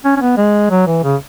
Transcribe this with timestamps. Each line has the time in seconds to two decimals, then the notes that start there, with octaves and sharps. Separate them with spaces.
0.05 C#4
0.17 C#4
0.21 B3
0.37 G#3
0.70 F#3
0.87 E3
1.04 C#3